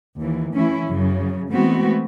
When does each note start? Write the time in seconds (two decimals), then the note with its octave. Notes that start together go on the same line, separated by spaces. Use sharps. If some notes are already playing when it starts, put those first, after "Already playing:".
0.20 D#2 E3
0.55 E3 A3 C#4 E4
0.88 F#2 C#3
1.52 E3 G#3 A3 B3 C4 F#4